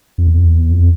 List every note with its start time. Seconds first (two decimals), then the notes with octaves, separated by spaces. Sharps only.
0.18 F2
0.28 E2
0.35 F2
0.44 E2
0.71 F2